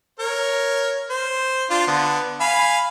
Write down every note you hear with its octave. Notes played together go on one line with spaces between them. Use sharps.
A#4 C#5
C5
D4 F4 C6
D3 B3
F5 G#5 B5